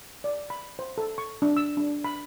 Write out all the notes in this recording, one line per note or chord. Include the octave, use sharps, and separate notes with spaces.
D5
B5
C5
A4
C#6
D4
E6
D4
B5